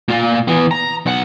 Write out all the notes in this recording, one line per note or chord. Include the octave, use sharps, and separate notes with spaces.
A#2 F4
E3 B3
A#5
B1 F#5